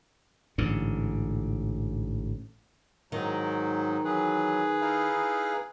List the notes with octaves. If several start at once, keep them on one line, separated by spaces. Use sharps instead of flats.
A1 G#2 D3
G#2 D#3 F#3 D#4
E3 F#3 G#4 B4
D#4 E4 F5